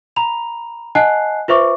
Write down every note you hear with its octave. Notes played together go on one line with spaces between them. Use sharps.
A#5 B5 F7
D#5 F#5 G#5 A5 F#6 C7
F4 B4 C5 E5 C#6 D6